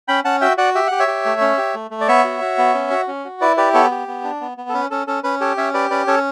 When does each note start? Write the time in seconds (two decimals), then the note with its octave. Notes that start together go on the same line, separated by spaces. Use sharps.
0.08 C#4 G5 B5
0.25 C#4 F#5 A5
0.41 F#4 E5 G5
0.58 F#4 D5 F#5
0.75 G4 E5
0.87 G4 F#5
0.99 C#5 E5
1.08 G4
1.25 A3
1.41 C#4
1.58 G4
1.75 A3
1.91 A3
2.01 D5
2.08 B3 C#5 E5
2.24 F#4
2.41 F#4
2.58 B3
2.74 C#4
2.90 F#4
3.08 C#4
3.25 F#4
3.41 E4 B4 D5
3.57 G4 B4 D5
3.74 B3 A4 C#5
3.91 G4
4.08 B3
4.24 D4
4.41 B3
4.58 B3
4.69 A4
4.74 C#4 B4
4.91 C#4 A4
5.07 C#4 A4
5.24 C#4 B4
5.41 G4 A4 C#5
5.57 C#4 C#5 E5
5.74 G4 B4 D5
5.91 C#4 B4 D5
6.07 C#4 A4 C#5